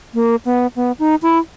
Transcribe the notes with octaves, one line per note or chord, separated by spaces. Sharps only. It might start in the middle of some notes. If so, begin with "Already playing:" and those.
A#3
B3
B3
D#4
E4